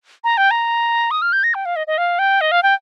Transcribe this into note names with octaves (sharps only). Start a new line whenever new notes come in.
A#5
G5
A#5
D#6
F6
G6
A#6
G5
F5
D#5
D#5
F5
G5
D#5
F5
G5